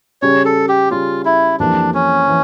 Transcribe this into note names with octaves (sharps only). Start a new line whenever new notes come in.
C#3 G3 C#4 C#5
A4
G4
C#3 G3 C#4 F4
E4
F2 E3 G3 A#3 D4 E4
C#4
E3